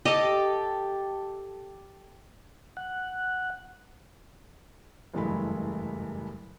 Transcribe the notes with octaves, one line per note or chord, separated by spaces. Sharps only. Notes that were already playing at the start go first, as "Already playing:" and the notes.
G4 A4 D#5
F#5
F#1 E2 G2 G#3 A3 B5